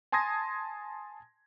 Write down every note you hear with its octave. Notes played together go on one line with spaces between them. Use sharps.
G#5 A5 C6 D#6 G#6 A#6